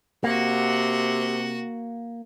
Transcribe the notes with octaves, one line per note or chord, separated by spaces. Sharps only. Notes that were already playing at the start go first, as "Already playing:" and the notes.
C3 A#3 F#4 F#5